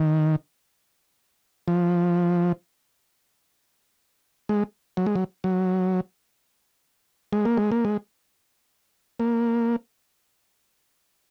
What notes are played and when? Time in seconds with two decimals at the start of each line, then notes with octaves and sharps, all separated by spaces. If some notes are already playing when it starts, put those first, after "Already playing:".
Already playing: D#3
1.68 F3
4.49 G#3
4.97 F#3
5.06 G#3
5.15 F#3
5.44 F#3
7.33 G#3
7.45 A#3
7.57 G#3
7.72 A#3
7.85 G#3
9.20 A#3